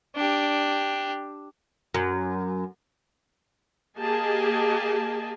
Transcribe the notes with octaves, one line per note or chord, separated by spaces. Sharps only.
D4 G4
F#2
A#3 G4 G#4 D#5 G#5 A5